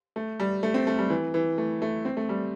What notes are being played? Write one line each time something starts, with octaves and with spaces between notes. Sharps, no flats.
A3
G3
A3
C4
A3
G3
E3
E3
A3
A3
C4
A3
G3